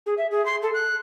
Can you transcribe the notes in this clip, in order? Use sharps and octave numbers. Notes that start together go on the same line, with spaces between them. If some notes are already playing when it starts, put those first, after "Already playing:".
G#4
E5
G#4
C6
A4
F#6